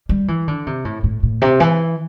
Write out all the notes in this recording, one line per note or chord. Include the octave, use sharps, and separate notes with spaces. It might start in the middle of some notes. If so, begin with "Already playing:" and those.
G3
E3
D3
C3
A2
A2
A2
C3
E3